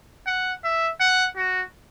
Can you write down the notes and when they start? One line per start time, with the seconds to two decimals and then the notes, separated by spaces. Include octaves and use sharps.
0.27 F#5
0.64 E5
1.00 F#5
1.36 F#4